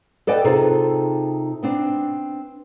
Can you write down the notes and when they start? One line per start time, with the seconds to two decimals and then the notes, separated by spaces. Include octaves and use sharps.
0.27 A4 B4 D5 D#5 G5
0.45 C3 D#4 F4 G#4 A4
1.63 B3 C4 D4